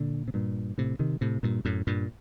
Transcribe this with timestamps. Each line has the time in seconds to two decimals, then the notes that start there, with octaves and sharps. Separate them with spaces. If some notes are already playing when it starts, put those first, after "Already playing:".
Already playing: A#2 D3
0.28 C3
0.34 G2 A#2
0.78 A2 C3
0.99 C3 D#3
1.21 A2 C3
1.43 G2 A#2
1.65 F#2 A2
1.87 G2 A#2